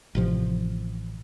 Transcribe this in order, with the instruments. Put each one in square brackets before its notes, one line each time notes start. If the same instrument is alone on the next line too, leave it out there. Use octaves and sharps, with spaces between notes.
[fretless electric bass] A1 C3 F3